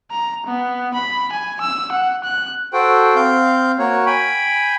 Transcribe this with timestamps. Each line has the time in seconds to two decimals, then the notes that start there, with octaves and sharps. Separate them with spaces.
0.11 A#5
0.47 B3
0.94 B5
1.32 G#5
1.61 E6
1.92 F#5
2.24 F#6
2.73 F#4 A4 C5 G5
3.15 C4 F5 G6
3.79 A#3 F#4 C#5
4.06 G5 G#5 B5